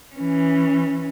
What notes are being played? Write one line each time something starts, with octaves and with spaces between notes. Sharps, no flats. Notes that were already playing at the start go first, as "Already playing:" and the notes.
E3 C#4